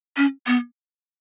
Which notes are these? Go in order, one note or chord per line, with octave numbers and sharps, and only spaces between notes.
C#4
B3